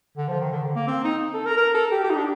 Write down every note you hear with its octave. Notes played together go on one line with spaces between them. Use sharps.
D3
F3
D#3
D3
D3
A#3
C4
D#4
A4
A#4
A#4
A4
G4
G4
D#4
D4